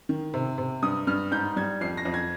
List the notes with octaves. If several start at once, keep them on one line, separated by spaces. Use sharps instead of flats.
D#3
C3
C3
G2 D#6
G2 F6
G#2 G6
G3 G#6
F2 C7
A#6
F2
G#6